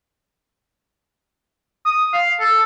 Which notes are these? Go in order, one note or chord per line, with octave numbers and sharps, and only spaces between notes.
D#6
F5
A4